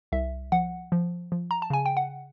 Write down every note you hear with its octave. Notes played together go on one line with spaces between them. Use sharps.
C2 E5
F3 F#5
F3
F3
A#5
A5
C#3 G#5
G5
F#5